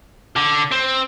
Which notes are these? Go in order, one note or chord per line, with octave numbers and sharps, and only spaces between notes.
D3
C4